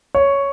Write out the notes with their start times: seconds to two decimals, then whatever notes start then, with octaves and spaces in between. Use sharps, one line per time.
0.15 C#5